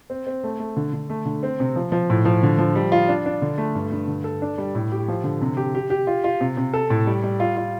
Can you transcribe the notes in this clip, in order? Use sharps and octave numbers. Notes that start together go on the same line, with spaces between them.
C4
C4
A3
A3
D3
D3
A3
D3
C4
C3
F3
F3
A2
F3
D3
F3
G3
F4
D4
D4
D3
A3
G2
G2
D3
A4
D4
G3
A2
G4
F3
D3
C3
G4
G4
G4
F4
F4
C3
C3
A4
A2
G3
G3
F4
F4